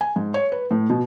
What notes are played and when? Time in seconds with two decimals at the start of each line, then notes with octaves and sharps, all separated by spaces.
0.01 G#5
0.16 G#2
0.34 C#5
0.52 B4
0.71 A2
0.90 B2